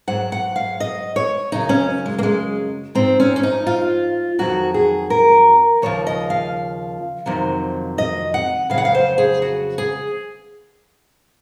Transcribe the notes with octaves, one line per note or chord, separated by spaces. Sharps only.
G#2 F#3 F#5
F#5
F5
D#5
C#5
F#2 C#3 F#3 D#4
C#4
G#3
A#3
G#3
G#2 F3 C4
C#4
C#4
D#4
F4
F2 D#3 F#3 F#4
G#4
A#4
D#2 C#3 F3 C#5
D#5
F5
F2 C3 D#3 F#3
D#5
F#5
F2 C#3 F#3 F5
F#5
F5
C5
G#4
F#4
G#4